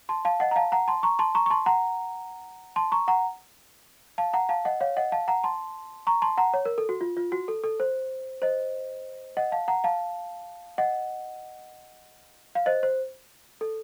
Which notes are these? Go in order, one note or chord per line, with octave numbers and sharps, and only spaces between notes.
A5 C6
F5 A5
D#5 F#5
A#5
F5 A5
F#5 A#5
A5 C6
A#5 C#6
A5 C6
A#5 C#6
C#6
A5 C6
F#5 A#5
A5 C6
A#5 C#6
F#5 A#5
F5 A5
F#5 A#5
F5 A5
D#5 F#5
C#5 F5
D#5 F#5
F5 A5
F#5 A#5
A5 C6
A#5 C#6
A5 C6
F#5 A#5
C#5
A#4
A4
F#4
F4
F4
F#4
A4
A4
C5
C5 D#5
D#5 F#5
F5 A5
F#5 A#5
F5 A5
D#5 F#5
F5
C5 D#5
C5
A4